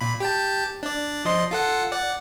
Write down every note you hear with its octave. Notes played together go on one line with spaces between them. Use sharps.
A#2 B5
G4 G5 A5
D4 D5
F3 D#5 C6
F4 A4 F#5
D5 F#5